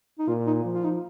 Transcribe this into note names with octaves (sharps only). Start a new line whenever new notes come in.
D#4
A#2 F4
D#4
F3
F4
D#4